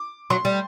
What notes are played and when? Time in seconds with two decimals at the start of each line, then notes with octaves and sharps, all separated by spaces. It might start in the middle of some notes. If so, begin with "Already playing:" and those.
Already playing: D6
0.30 F#3 C6
0.45 G3